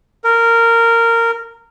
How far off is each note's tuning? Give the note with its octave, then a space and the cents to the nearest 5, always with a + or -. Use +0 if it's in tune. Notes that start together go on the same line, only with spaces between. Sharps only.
A#4 -15